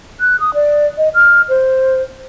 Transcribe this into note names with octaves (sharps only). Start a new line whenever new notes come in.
F#6
D#6
D5
D#5
F6
C5